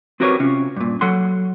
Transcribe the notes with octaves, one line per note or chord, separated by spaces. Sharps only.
C4 F#4 G4 A#4 B4 C#5
C3 C#4 F4
G2 A#2
F#3 A4 F#5 C6